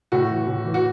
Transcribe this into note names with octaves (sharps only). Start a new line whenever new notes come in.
A2 F#4
E3
A2
E3
F#4